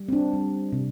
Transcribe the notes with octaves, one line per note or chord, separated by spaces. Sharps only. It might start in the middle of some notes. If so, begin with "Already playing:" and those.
Already playing: G3
C4
D4
G3
C3